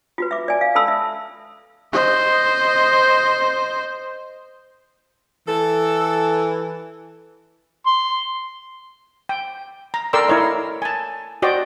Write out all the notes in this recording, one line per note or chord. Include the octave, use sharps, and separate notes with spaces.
F4 F#4 B4
E5 D6
D5 G#5
F5
A4 A5 B5 E6
E5 A5
C5 D#5
E3 A4
C6
G5
A#5
A4 A#4 D5 G5 C6 E6
E4 A#4 C#5 D#5 C6
G#5 A5
F#4 C5 D5 D#5 G5